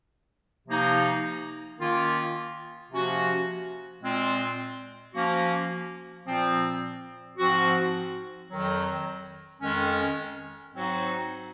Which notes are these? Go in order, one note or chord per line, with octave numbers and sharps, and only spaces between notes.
C3 F3 A#3 D#4
D#3 A#3 C#4 F4
C3 F3 A#3 C#4 F#4
A#2 G#3 C4 F4
F3 A#3 C#4 F#4
A#2 F3 C4
G#2 F3 C4 F#4
F2 D#3 F#3
F2 D#3 G#3 C#4
G#2 F#3 C4 D#4 F#4